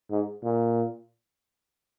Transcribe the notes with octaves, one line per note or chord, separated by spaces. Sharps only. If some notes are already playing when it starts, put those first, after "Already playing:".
G#2
A#2